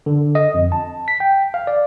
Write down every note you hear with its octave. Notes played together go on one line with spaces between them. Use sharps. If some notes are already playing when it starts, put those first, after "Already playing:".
D3
D#5
F2
A5
B6
G5
F5
D5